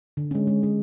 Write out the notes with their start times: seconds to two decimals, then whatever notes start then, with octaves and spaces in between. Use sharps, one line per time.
0.17 D3
0.31 G#3 C#4
0.47 G#3
0.62 C#4 G#4